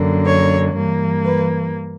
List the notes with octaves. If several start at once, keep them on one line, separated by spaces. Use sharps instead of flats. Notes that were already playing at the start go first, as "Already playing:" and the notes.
Already playing: F#2 D3 A#3
C#5
G2 E3 A#3
B4